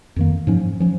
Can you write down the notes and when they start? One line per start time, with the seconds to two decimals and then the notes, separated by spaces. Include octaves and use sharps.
0.16 F2 D#3 A#3
0.47 G#2 F3 C#4
0.80 F3 C#4